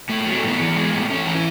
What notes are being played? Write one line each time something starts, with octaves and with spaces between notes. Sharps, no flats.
A2 A3
A3
F#3
A3
A2 B3
E3
G#3
A2
A2 C#4
E3
E4